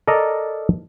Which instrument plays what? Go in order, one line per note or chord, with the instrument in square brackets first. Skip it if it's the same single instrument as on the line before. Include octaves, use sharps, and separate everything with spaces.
[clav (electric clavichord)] A4 A#4 D5 D#5 A#5